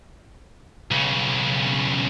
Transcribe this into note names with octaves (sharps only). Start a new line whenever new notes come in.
B1 C#3